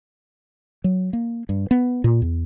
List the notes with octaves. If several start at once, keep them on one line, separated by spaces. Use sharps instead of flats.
F#3
A#3
G2
B3
A#2
E2